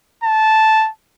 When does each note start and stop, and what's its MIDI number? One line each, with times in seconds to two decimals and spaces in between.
0.24 0.89 81